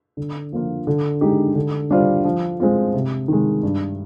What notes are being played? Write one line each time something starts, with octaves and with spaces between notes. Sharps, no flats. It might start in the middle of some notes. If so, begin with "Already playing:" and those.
D3
F3 A#3 F4
D3
G#3 D#4 G4
D3
G3 D4 F4 C5
F3
G#3 C4 F4
C3
D#3 G#3
G2